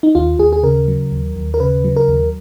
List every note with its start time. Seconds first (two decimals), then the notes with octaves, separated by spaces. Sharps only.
0.03 D#4
0.15 D#2 F4
0.39 D#2 G#4
0.53 G#4
0.63 C#3 A#4
0.88 F#3
1.12 D#2
1.36 D#2
1.54 A#4
1.60 C#3 B4
1.84 F#3
1.96 A#4
2.08 D#2